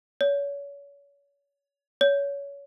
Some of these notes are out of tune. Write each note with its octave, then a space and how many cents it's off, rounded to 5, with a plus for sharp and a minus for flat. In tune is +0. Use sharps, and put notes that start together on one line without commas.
C#5 +35
C#5 +25